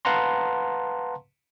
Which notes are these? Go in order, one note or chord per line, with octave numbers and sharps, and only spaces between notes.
B4 F5 F#5 A5 A#5 C6